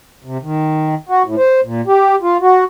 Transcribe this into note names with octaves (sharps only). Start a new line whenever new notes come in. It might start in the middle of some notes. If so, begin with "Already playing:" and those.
C3
D#3
F#4
A2
C5
A#2
G4
F4
F#4